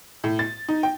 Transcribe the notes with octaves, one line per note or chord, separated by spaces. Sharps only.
A2
A6
D#4
G5